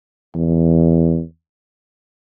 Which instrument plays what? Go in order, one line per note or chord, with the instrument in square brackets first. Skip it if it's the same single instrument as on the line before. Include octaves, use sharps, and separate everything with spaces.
[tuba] E2